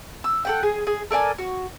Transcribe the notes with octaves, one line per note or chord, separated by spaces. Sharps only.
E6
A4 F#5 G5
G#4
G#4
A4 A#4 D5 G#5
F#4